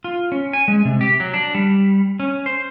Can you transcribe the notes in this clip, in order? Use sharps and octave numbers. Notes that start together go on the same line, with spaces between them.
F4
C#4
G#5
G#3
C3
G4
F#3
D4
G3
C#4
C5